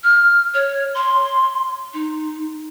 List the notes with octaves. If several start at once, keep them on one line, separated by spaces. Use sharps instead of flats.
F6
C#5
C6
D#4